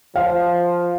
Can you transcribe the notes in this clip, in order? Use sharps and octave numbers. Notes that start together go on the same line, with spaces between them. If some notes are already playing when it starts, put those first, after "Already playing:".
F3 F5